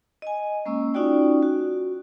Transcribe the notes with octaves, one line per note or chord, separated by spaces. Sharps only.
D#5 G#5
G#3 A#3 C#4 E6
C#4 D#4 F4 F#4 D5 G5
F#4